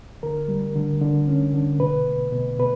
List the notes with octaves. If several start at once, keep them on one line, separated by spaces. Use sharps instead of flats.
D3 A#4
G3
D3
D3
C#4
D3
B2 B4
B2
B2
B2 B4